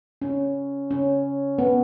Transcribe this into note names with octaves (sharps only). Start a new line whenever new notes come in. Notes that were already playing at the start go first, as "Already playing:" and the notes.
C#4
C#4
B3